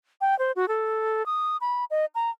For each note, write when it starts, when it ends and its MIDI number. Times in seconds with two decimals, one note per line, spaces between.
0.21 0.38 79
0.39 0.52 72
0.56 0.68 66
0.68 1.25 69
1.26 1.57 87
1.61 1.85 83
1.91 2.05 75
2.15 2.30 82